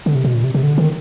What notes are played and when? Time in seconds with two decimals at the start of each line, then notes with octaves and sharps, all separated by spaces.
0.06 D3
0.15 C3
0.25 B2
0.34 A#2
0.44 C3
0.54 C3
0.63 D3
0.78 D#3